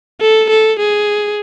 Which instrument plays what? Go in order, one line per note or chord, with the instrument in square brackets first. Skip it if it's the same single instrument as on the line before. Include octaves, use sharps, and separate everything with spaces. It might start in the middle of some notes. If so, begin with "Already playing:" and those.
[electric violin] A4
A4
G#4